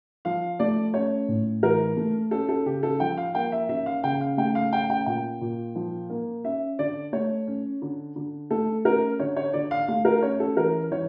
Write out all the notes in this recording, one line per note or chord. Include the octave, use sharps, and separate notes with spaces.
F3 F5
A3 D5
C#4 C#5
A2
E3 A#4
A3
C#4 A4
A4
C#3 G4
A4
F3 G5
F5
A#3 G5
E5
C#4 E5
F5
C#3 G5
F5
A3 G5
F5
C#4 G5
G5
A#2 G5
A#2
F3
A#3
C#4 E5
D3 D5
A3 C#5
C#4
D3
D3
A3 A4
C#4 A#4
D3 C#5
C#5
D3 D5
F5
A3 F5
A#4
C#4 C#5
A4
E3 A#4
E3 C#5